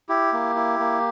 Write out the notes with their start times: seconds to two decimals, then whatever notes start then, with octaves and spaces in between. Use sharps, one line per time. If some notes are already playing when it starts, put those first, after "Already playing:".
0.09 E4 G4
0.33 A#3
0.56 E4
0.80 A#3